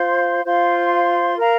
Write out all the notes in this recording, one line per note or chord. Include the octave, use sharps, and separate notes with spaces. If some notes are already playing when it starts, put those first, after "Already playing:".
Already playing: F4 C5 F5 C6
F4 C5 F5 C6
A#4 F5 A#5